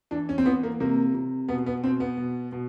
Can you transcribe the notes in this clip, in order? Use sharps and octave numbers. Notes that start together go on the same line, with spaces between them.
E3 D4
C#4
C4
E3 B3
A#3
C3 A#3
C3
B2 B3
B3
B2 C4
B3
B2
B2